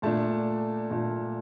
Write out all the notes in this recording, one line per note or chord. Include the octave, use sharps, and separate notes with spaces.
A#2 A3 D4 A5
A#2 A3 D4